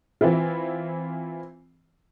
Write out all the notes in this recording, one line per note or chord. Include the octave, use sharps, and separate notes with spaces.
E3 C4 E4 F4